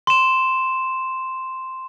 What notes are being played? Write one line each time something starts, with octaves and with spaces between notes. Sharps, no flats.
C6 E7